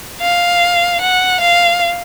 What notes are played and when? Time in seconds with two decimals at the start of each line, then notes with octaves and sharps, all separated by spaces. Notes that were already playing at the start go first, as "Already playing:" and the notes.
0.21 F5
1.01 F#5
1.41 F5